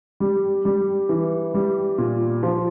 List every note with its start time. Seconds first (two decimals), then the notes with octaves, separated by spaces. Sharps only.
0.20 G3
0.65 G3
1.09 E3
1.54 G3
1.98 A#2
2.43 F3